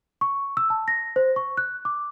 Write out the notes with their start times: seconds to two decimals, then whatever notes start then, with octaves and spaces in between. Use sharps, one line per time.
0.21 C#6
0.57 E6
0.70 A5
0.88 A#6
1.16 C5
1.36 C#6
1.57 F#6
1.85 D6